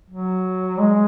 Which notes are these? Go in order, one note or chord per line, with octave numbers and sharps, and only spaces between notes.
F#3
G#3